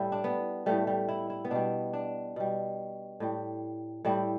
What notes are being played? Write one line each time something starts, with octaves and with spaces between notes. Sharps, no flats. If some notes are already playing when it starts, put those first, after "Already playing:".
Already playing: A2 G3 E4
D4
B3
A2 G3 A3
G3
E4
E4
B3
B2 G3 D4
D4
B2 G3
A2 G3
A2 G3 E4